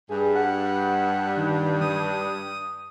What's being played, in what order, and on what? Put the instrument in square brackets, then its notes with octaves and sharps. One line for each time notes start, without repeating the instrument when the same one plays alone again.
[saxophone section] G2 [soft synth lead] G#4
[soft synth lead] F#5
D#3
D#6